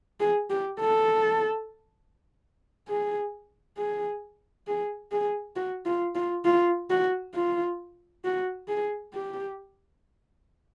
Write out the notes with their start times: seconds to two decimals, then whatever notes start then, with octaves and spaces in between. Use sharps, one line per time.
0.20 G#4
0.50 G4
0.80 A4
2.88 G#4
3.77 G#4
4.67 G#4
5.12 G#4
5.56 F#4
5.86 F4
6.15 F4
6.45 F4
6.90 F#4
7.35 F4
8.24 F#4
8.68 G#4
9.13 G4